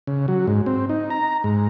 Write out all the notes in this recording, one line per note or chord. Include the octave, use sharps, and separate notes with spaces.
C#3
F#3
G#2
C4
D#4
A#5
G#2